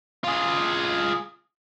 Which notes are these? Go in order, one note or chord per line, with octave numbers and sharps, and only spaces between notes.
F4 G#4